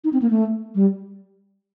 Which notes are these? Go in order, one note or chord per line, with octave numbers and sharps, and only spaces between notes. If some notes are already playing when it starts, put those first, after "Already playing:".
D#4
C4
A#3
A3
G3